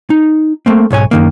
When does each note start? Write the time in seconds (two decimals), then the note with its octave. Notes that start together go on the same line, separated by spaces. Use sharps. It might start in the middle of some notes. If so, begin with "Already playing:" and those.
0.10 D#4
0.66 A3 A#3 C4
0.90 B1 G#2 C#5 G#5
1.11 F#2 D#3 A#3